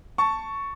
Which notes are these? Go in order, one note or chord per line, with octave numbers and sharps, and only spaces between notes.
A5 C#6